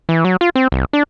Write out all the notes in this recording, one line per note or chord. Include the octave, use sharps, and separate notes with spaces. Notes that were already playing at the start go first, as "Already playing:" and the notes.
E3
F#3
F4
C4
C2
D4